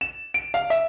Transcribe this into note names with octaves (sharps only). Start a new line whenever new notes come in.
E7
D7
F5
E5